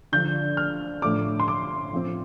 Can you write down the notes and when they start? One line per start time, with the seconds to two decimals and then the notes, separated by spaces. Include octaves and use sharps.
0.12 D3 F3 D4 G6
0.57 F6
1.02 A2 F3 A3 D4 D6
1.40 C6
1.48 D6
1.93 F3 C4